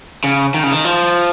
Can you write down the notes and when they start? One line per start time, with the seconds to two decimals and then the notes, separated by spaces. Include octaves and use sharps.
0.24 C#3
0.54 D#3
0.63 C#3
0.72 D#3
0.85 F3